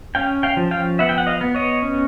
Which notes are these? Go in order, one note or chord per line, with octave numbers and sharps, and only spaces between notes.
C#4 F5 G5
F5 G5
F3
F5 G5
B3 E5 F#5
G5
F#5
D#5 F5
B3
C#5 D#5
C#4